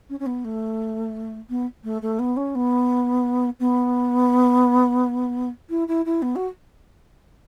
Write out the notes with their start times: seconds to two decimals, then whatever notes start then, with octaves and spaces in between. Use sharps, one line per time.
0.10 C#4
0.20 C#4
0.26 B3
0.45 A3
1.50 B3
1.84 A3
2.02 A3
2.19 B3
2.37 C#4
2.55 B3
3.60 B3
5.70 E4
5.88 E4
6.05 E4
6.22 B3
6.36 F#4